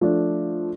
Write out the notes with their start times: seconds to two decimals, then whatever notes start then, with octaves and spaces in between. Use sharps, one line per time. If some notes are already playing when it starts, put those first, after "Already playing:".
0.01 F3 A3 D4